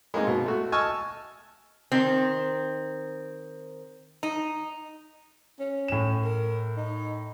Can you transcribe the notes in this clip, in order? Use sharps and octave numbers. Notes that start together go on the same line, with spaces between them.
G#3 A#3 C4 D#4
B2
A3 F#4
D#5 G#5 A5 C#6 E6 F6
D#3 C4
D#4
C#4
A2 E7
A#4
D#4